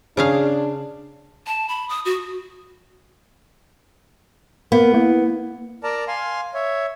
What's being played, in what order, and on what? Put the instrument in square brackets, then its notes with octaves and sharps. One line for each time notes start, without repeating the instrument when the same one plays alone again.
[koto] C#3 G#4 F5 [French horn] D4
[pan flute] A5
B5
D#6
F#4
[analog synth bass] A#3 [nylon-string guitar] B3 [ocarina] A#4
[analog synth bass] A#3 [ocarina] E4
[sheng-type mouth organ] A#4 D5 A5 A#5
F5 G#5 C6
C#5 E5